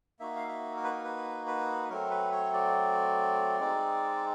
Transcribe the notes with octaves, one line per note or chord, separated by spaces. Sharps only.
A#3 D#4 F#4 E5
F5
E5
A#4
B4
A#4
B4
B4
F#3 A3 C4 A#4
B4
C#5
D5
G#3 C4 D#4